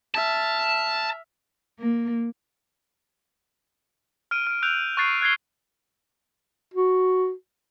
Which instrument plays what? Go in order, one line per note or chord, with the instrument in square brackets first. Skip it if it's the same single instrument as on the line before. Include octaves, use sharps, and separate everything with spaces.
[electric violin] E5 F6 [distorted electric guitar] A5
[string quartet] A#3
[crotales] F6 D7 D#7
F6 D7
E6 F#6 G6 D7 F7
C#6 F#6 A6 C7 D#7
F#6 G#6 A6 C7 G7
[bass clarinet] F#4